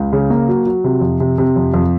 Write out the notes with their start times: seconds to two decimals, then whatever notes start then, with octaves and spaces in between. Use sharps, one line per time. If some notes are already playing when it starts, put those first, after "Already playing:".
Already playing: C#2
0.13 C#3
0.30 A#3
0.48 F#3
0.66 F#3
0.84 C3
1.01 F2
1.20 C3
1.38 C3
1.56 F2
1.74 F2